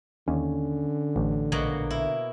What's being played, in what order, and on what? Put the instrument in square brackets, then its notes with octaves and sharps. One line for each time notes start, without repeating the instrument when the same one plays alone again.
[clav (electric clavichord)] D#2 [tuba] D3 [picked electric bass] C#4
[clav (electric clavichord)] A1
[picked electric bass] A#1 [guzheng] B2 F#3 A#3
[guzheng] E4